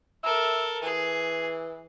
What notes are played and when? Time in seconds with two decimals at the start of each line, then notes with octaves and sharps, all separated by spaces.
0.24 A4 A#4 E5
0.82 E3 G#4